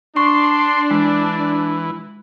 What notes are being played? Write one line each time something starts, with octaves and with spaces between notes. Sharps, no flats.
D4 C6 C#6
E3 G#3